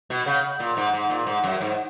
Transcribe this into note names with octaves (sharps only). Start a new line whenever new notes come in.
B2
C#3
A#2
G#2
G#2
A#2
G#2
F#2
G#2